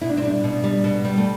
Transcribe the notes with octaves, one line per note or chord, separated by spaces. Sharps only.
B2 E4
D4
C4
G3 D4
B2
G3
B2
G3
A3